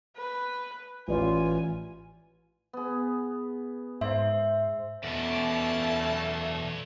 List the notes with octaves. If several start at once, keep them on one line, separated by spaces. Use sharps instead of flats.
B4
A1 F4 B4 D5 G#5
B3 G#4
G#2 C5 E5
E2 B2 A3 A#3 C#4 B4 D5 A5